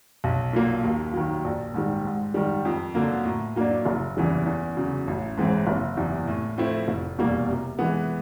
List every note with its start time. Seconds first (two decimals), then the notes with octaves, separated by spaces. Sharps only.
0.24 B1
0.53 A#2 F#3 A#3
0.84 D#2
1.13 D#3 F#3
1.44 A#1
1.74 G#2 D#3 G3
2.05 G#2
2.34 D#3 G3
2.65 F2
2.95 D3 F#3 A#3
3.25 A2
3.56 F#3 A#3 D4
3.86 F#1
4.17 E2 C#3 E3 G3
4.46 E2
4.77 C#3 F#3
5.07 A1
5.37 G#2 E3 G#3 C4
5.67 F#1
5.97 E2 C3
6.28 A2
6.58 F3 A3 C4 E4
6.88 F1
7.19 E2 B2 G3 A#3
7.48 C3
7.79 E3 G#3 B3